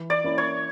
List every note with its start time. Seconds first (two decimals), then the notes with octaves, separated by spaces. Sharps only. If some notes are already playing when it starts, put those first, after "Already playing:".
Already playing: E3
0.10 D5
0.24 A#3 C#4 E4
0.38 C#5